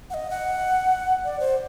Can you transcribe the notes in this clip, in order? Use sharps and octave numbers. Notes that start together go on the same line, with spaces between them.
F#5
D#5
F#5
D5
C5